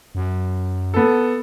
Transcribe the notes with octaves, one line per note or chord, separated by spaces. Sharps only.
F#2
B3 A4